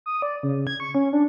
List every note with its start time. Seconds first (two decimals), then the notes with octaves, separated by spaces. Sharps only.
0.06 D#6
0.22 D5
0.43 C#3
0.67 G#6
0.80 C#6
0.95 C#4
1.13 D4